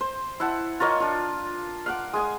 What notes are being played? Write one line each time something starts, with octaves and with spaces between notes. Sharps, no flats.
C5
E4 E5 F#5 A5
F4 A#4 C#5 D#5
D4 F4
F5 F#5 D6
G#3 G#5 D#6